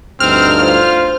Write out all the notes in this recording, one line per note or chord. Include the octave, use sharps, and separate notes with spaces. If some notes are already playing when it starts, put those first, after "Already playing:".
D2 G2 C4 D#4 F6
F4 C5